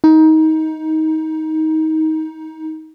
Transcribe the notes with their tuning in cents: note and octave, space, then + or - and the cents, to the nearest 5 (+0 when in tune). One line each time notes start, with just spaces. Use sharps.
D#4 +20